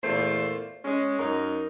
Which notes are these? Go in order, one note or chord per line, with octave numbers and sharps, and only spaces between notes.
E2 A#2 A3 C5
G#3 C#4
F#2 D#4 A#4